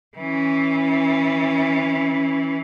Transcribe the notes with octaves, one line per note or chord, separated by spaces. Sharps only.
E3 C#4